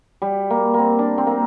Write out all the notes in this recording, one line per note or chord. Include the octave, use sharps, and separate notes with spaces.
G3
A#3
A#3 C4
D4
C4
A#3